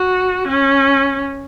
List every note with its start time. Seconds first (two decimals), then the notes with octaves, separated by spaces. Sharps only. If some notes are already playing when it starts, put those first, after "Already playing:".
Already playing: F#4
0.48 C#4